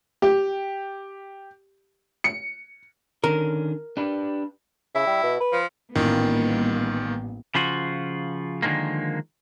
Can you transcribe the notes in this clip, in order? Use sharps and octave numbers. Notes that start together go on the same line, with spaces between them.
G4
C#7
D3 D#3 C#4 A#4
D4 G4 B4
C#3 E4
G3
B2
B4
F3
A1 A#2 D#3 G3 A#3 B3
C#3 F3 F4 F#4
D3 D#3 F3 G#3 A#3